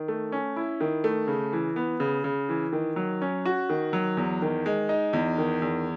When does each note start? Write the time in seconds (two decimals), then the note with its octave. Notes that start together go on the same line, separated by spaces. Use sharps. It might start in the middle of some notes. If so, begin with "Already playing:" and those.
Already playing: D#3
0.08 A3
0.32 C#4
0.56 E4
0.81 D#3
1.04 A3
1.28 C#3
1.53 E3
1.76 B3
2.00 C#3
2.24 C#3
2.49 E3
2.73 D#3
2.96 F#3
3.22 C#4
3.45 F#4
3.69 D#3
3.93 F#3
4.17 E2
4.42 D#3
4.66 G#3
4.89 D#4
5.13 E2
5.38 D#3
5.62 E2